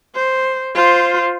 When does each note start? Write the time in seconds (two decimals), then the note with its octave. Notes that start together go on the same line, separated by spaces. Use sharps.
0.15 C5
0.75 F4 C5